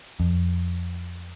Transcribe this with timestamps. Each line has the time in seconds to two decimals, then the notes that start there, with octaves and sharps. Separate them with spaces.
0.20 F2